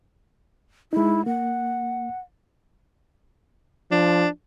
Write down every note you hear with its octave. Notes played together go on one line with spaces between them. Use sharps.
G#3 D#4 E4
A#3 F#5
F3 D4